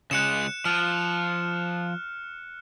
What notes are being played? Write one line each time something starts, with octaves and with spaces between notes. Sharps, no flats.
C#3 G#3 F#6 C#7 E7
F3 F6